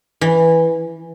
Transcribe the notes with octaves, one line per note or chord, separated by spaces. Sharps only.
E3